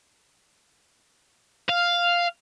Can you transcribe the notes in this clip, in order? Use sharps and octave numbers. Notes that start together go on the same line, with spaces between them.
F5